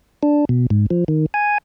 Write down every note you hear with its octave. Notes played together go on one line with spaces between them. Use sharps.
D4
B2
G#2
F3
D#3
G#5